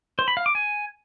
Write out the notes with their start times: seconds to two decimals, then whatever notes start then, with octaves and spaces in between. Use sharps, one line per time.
0.19 C5
0.28 B5
0.37 F5
0.46 D6
0.55 G#5